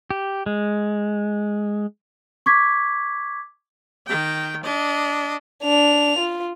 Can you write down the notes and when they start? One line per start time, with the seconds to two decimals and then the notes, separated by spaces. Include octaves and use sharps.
0.11 G4
0.46 G#3
2.46 C#6 D6 G#6 B6
4.07 D#3 G5
4.63 D4 D#5
5.63 D4 F7
6.19 F4